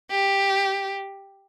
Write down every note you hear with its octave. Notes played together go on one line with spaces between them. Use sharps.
G4